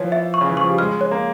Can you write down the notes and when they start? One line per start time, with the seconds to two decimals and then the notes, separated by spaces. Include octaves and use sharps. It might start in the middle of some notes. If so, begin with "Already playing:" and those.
Already playing: E3 F3 C#5
0.12 E5
0.34 C#6
0.41 C#3
0.49 E3
0.57 F3 C#6
0.69 G3
0.78 G#3 F6
1.01 C#5
1.11 A#3